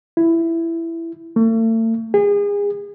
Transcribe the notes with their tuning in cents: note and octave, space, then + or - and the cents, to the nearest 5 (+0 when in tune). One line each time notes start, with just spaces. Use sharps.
E4 +10
A3 +40
G#4 -35